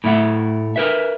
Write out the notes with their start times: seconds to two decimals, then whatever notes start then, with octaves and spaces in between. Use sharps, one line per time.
0.04 A2 A3 E5 F#5
0.76 A#4 B4 E5